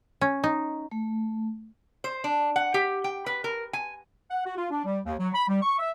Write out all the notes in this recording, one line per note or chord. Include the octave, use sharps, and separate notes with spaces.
C#4
D#4
A3
C5
D4
F#5
G4
G5
B4
A#4
G#5
F#5
F#4
F4
D4
G3
D#2
F#3
B5
G3
C#6
E5